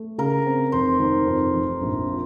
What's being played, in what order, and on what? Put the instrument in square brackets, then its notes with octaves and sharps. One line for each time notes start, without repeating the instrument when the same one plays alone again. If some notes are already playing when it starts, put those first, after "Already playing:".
Already playing: [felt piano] A3
[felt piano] C#3 [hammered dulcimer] A#4
[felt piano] C4
[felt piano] F1 [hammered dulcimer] C5
[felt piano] D#3
F2
F1
A#1
F3